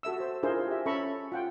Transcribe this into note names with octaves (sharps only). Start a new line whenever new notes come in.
F#4 A4 E5 E6
C5
D4 E4 F4 G#4 A#4 C5
G4 E5
C#4 A4 E5 A#5 B5 C#6
F4 F#5 G5